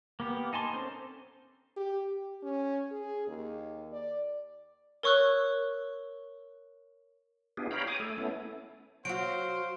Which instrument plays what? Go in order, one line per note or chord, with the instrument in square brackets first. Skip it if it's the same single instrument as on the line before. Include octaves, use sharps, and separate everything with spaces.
[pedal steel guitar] A#3 B3 G4
D#4 G#5 A5 C6
C4 C#4 A4 C5
[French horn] G4
G4
C#4
G#4
D#2
D5
[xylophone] A#4 C#5 C#6 E6 F#6
[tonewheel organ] B3 D4 E4 F4 G4 G#4
C#5 F5 G5 A#5 B5
C#5 G#5 D6 D#6
A3 A4
A3 B3 C#4 E4 A4
[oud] F#3 F#4 [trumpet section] C5 F5 [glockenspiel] D7